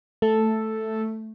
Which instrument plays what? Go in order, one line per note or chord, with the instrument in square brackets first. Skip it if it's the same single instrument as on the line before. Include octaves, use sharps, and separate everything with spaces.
[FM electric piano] A3 [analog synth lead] A4